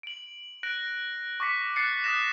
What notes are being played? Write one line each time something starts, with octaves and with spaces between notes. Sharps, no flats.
D7 F#7
F#6 A#6 D7 F#7
C#6 D6 A#6 B6 C#7
F#6 A6 C7 C#7
D#6 F#6 A#6 E7